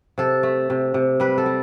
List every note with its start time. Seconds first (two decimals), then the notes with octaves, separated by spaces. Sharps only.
0.18 C3 A4
0.43 A3
0.70 C3
0.94 C3
1.20 G3 B4
1.38 A4
1.46 G3